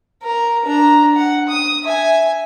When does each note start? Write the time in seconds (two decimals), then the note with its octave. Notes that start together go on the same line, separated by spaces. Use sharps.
0.23 A#4
0.65 D4 A#5
1.16 F#5
1.49 D#6
1.84 E5 G#5